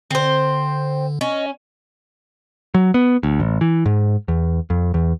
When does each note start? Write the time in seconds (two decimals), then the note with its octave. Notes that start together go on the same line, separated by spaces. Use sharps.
0.11 D3 C4 C5
1.21 C#4 D#5
2.75 F#3
2.94 B3
3.23 D2
3.40 A1
3.61 E3
3.86 G#2
4.28 E2
4.70 F2
4.94 E2